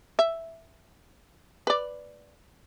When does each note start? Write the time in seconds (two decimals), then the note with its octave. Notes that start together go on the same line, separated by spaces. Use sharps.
0.19 E5
1.67 B4 D5